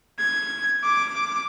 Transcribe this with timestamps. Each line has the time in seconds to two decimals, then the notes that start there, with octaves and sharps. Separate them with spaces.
0.19 G#6
0.84 D6